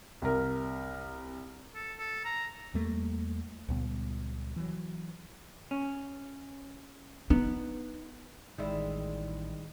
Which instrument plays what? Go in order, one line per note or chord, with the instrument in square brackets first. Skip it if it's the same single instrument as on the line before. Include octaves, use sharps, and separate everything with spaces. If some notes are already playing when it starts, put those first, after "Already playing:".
[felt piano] C2 A#4
[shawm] A4
A4
A#5
[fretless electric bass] E2 G3 A3 A#3
C#2 A#2 G3 B3
E3 F#3
[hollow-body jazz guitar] C#4
[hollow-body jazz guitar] B3 [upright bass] D#4
[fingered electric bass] A1 [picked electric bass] D#3 [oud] G3 G#3 E4